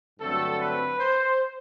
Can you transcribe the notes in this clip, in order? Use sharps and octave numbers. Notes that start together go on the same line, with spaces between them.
G2 D3 F#3 A3 C4 A4
B4
C5